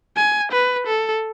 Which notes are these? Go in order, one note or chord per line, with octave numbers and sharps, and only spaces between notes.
G#5
B4
A4